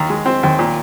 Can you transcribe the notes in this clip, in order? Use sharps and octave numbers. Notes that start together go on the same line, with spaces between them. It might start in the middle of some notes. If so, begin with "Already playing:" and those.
Already playing: D#2 A#5
G#3
C4
D#2
A#2